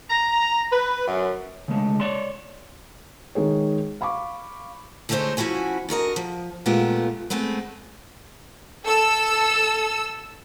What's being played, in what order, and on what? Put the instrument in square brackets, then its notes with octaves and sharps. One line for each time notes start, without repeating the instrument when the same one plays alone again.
[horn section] A#5
B4
F#2
[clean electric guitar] C#3 G#3 A3
C#5 D5 C6
[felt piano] D#3 G#3 G#4 C#5
F5 B5 C#6 D6
[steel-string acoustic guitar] D3 G#3 A3 D#4 C5 C#5
F3 C#4 E4 F#4 G#5
D3 F#4 A#4 D#5
F3
A#2 G#3 A3 B3 F4 G4
G#3 A3 B3 C4 B4
[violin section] A4 E6